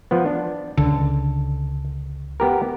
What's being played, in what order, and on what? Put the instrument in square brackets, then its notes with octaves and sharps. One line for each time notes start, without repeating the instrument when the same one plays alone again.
[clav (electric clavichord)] F3 B3
D4
[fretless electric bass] C#2 D3 [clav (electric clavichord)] A4
[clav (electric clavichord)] B3 G4 A#4